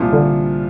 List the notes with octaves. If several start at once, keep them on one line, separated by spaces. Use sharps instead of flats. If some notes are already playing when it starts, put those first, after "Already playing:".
Already playing: C2 A#2 F3
D3